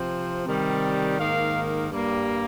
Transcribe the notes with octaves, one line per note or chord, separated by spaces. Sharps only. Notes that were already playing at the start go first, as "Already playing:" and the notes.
Already playing: C3 F3 C4
C3 D#3 G3
G#2 D#3 A#3 F5
G2 G3 A#3